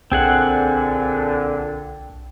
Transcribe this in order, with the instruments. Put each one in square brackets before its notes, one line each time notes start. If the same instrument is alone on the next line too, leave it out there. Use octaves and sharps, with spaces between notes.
[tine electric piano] B1 G5 [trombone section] A#2 D3 [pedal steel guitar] C4 G#4 F#5